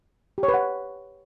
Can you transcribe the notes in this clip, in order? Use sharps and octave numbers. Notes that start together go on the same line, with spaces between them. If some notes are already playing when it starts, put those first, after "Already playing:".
G4
C#5
B4
F#5